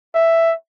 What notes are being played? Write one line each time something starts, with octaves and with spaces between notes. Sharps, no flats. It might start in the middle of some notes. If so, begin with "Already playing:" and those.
E5